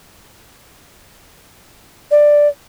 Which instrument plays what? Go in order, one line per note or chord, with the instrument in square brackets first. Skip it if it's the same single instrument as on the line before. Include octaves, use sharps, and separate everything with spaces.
[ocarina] D5